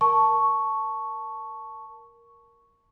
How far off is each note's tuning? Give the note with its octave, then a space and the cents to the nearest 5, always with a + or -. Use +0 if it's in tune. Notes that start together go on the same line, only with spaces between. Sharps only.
A#4 +0 A5 +0 C#6 +0